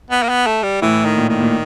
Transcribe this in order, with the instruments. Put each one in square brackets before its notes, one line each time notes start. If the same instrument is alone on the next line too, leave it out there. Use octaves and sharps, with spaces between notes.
[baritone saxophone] B3
A#3
B3
A3
G3
[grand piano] A2 [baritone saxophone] E3
[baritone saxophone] D#3
[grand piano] A#2
[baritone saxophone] D#3
[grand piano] A#2